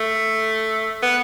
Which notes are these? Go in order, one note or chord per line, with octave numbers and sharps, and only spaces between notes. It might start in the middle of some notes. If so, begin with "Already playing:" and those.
Already playing: A3
B3